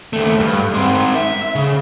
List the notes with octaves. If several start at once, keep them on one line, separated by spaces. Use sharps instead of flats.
D#2 A3
G2
G#3 C4
E5
C#3